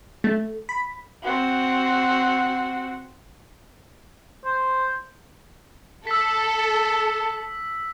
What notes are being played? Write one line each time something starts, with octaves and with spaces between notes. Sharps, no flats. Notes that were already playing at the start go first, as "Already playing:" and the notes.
A3
B5
C4 F#4
C5
A4 E6 B6